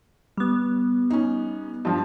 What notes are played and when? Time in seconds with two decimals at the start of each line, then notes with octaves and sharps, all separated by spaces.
0.37 G3 B3
1.10 C#4 D#4
1.85 G2 F3